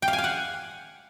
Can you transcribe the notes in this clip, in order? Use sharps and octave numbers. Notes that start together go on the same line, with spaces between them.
G5
F5
G#5
F5
F#5